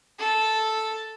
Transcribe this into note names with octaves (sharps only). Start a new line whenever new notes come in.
A4